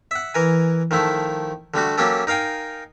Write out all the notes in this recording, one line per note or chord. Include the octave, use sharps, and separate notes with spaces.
E5 F#5
E3 A#4 G#5
D#3 F3 A3 E4
D3 G3 A3 F#4
F#3 A#3 C#4 G4 A4
D#4 A#4 F5 G5 G#5